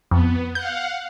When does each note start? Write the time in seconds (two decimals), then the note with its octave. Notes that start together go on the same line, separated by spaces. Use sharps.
0.11 F2 B3
0.55 F5 F#5 G6